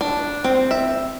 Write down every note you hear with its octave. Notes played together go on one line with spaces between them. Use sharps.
D4
C4
E5